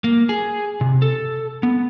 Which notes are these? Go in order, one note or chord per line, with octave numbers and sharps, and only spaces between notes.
A#3
G#4
C3
A4
B3